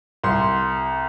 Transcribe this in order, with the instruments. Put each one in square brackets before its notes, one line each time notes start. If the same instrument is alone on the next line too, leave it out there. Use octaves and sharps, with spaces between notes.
[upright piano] C2 C6